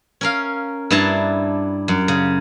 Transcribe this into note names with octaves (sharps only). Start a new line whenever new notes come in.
C#4 A#4 F5
G2 D4 E4 A5 A#5 C6
F#2
C#3